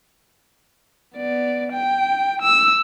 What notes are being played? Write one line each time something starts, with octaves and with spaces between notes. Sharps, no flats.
B3 D5
G5
E6